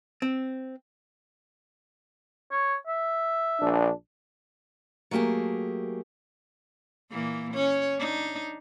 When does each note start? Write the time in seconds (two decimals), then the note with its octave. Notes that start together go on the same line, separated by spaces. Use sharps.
0.22 C4
2.52 C#5
2.87 E5
3.59 A#1 D4
5.11 F#3 A3 A#3 G4 G#4
7.11 A#2 E3 A#3
7.54 C#4 C#5
7.99 D4 D#4